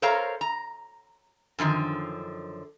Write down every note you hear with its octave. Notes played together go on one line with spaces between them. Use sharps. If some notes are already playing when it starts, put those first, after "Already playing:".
A4 A#4 C5 C#5 F5 A#5
A#5
F#2 D3 D#3 F3